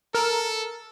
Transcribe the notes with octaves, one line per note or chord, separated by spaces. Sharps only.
A4 A#4